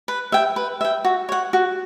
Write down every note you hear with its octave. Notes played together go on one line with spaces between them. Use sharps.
B4
E5 G5
B4
E5 G5
F#4
C#5 F#5
F#4